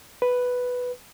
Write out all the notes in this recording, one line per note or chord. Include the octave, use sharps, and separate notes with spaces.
B4